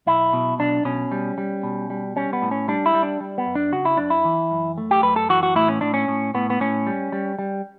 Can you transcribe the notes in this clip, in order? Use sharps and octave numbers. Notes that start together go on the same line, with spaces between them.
B1 E4
B2
B1 D4
B2 C#4
G3
G3
B2
G3
G3 C#4
B3
A2
C#4
G3 D4
E4
G3
D4
G3
B3
F#2
D4
C#3 F#4
E4
F#2 D4
E4
E3
F#2
A3
G4
F#2 B4
A4
E3 F#4
F#4
A2 E4
C#4
A2 D4
C#4
A2
A2 B3
B3
A2 C#4
G3
G3
G3